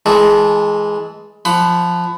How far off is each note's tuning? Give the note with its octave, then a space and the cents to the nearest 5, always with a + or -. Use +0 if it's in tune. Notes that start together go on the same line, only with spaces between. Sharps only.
E3 -15 G#3 +5 A4 +0
F3 +0 F#5 +10 B5 +25